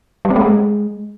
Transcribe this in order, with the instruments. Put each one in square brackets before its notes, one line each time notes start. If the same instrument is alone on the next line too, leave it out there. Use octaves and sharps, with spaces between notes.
[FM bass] G3
C4
A3
G#3